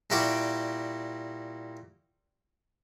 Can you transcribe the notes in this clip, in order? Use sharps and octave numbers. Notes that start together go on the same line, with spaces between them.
A#2 G3 E4 F#4 G5 D6